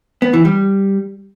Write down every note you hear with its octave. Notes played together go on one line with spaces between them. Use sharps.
B3
E3
G3